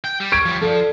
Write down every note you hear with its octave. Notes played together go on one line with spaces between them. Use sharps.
G5
G3
C#6 G#6 D7
F3 G3
F3 A4 D5